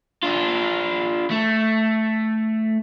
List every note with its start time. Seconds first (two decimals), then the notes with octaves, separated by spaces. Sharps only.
0.23 D4 F4
1.31 A3